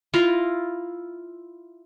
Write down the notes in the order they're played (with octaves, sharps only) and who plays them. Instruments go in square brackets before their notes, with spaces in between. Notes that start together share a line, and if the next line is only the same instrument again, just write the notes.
[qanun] E4 F4 A#5